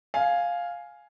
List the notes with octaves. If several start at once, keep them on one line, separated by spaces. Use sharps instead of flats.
F5 G#5